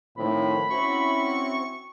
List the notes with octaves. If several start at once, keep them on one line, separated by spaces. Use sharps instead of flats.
A2 D#3 F3 C4 B5
C4 C#4 E4 F#4 C#6